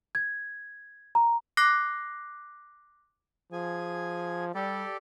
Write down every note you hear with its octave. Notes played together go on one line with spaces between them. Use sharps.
G#6
A#5
D6 F#6 A#6 C7
F3 G#4 G#5
G3 G4 A4 D5